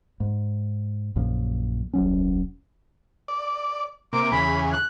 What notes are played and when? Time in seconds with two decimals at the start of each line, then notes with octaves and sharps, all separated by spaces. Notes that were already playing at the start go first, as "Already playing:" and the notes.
0.20 G#2
1.16 A#1 F#2 A#2 F3
1.93 D#1 C2 F#3 C#4
3.28 D5
4.13 C3 A#3 D6
4.32 E2 C#3 G#4 B5
4.73 F#6